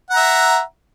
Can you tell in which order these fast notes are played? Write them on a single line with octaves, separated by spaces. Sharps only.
F#5 A#5 E5